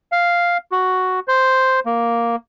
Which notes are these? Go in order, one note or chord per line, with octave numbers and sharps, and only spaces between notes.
F5
F#4
C5
A#3